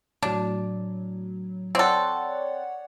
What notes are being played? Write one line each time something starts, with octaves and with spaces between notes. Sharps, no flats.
A2 F#3 D4
C4 A4 C#5 D5 F#5